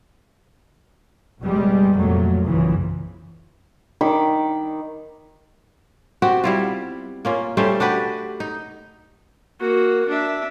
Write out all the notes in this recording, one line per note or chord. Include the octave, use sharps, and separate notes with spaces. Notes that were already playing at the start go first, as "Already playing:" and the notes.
F#1 B2 G3 G#3
F1 F2 A#2 F#3 A3 A#3
B1 F#2 C#3 E3 F3
D#3 B5 D6
B3 C4 F#4 G4
G3 E4 F4
A#3 C#4 F4
G3 A3 C#4 C5
D4 F#4 G4 B4
D#4
A#3 F#4
D4 E5